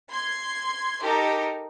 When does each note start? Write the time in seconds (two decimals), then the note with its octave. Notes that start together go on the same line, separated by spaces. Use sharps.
0.10 C6 G#6
1.02 D#4 G4 A4 A#4